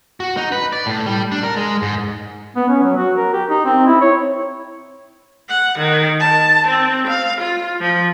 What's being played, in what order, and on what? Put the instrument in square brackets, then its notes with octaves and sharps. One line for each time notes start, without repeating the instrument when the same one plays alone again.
[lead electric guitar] F#4
D#4
B4
D5
A2
G3
D4
A#4
G#3
G#2
[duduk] B3
C#4
F#3
F#4
A#4
G4
D#4
C4
E4
C#5
[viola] F#5
D#3
A5
C4
F5
F4
F3